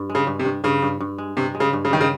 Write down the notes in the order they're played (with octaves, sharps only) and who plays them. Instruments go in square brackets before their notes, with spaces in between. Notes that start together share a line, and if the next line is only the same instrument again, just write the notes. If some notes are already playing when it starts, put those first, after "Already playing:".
Already playing: [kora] G2
G#3
[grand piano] C#3
[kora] G2
[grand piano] C3
[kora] G2
[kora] G2 [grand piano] C#3
[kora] G2
G2
G#3
[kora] G2 [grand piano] C3
[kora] G#3
[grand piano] C#3
[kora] G2
[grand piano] C#3
[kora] G2 [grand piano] D#3
[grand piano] C#3